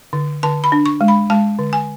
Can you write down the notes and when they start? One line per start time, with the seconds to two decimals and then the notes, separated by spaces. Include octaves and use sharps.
0.13 D3
0.43 D3 A5
0.64 B5
0.72 D4
0.86 C#6
1.01 G#3
1.08 B5
1.30 G#3 A5
1.59 D3
1.73 G#5